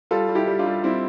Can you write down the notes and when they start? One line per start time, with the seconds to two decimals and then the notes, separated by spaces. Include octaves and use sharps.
0.11 G3 F4 A4
0.29 G3
0.35 E4 G4
0.47 G3
0.59 D4 F4
0.66 G3
0.83 G3 C4 E4